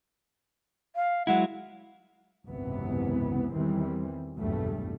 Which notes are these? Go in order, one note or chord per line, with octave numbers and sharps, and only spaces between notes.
F5
F#3 G#3 E4 F#5
G#1 C#2 F#2 C3 E3 B3
E2 D#3 E3 G3 C4
F1 B1 E2 G2 G3 A3